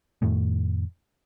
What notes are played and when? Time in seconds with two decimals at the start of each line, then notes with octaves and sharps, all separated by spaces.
0.22 F2 A2 D#3 A3